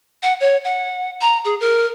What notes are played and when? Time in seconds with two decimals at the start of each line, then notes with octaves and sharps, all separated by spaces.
0.23 F#5
0.40 C#5
0.64 F#5
1.21 A#5
1.45 G#4
1.60 A#4